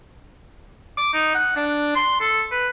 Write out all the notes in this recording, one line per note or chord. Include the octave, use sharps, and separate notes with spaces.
D6
D#4
F#5
D4
C6
A4
B4